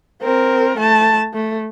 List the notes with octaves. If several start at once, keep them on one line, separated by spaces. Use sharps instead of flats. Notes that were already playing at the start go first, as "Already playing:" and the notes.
C4 A#4
A3 A5
A3